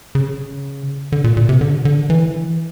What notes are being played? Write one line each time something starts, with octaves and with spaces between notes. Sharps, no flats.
C#3
D3
A#2
A#2
C3
D3
D3
E3